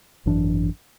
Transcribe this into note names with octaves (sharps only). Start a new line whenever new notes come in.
G#1 F#2 E3 D4